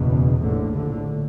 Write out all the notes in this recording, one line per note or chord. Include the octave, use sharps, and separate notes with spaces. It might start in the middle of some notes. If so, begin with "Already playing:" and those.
Already playing: F#1 E2 B2
C#3
A#1 A2 D3
D3